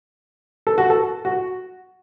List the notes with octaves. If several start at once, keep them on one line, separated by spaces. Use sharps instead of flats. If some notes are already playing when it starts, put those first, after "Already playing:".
A4
F#4
A4
F#4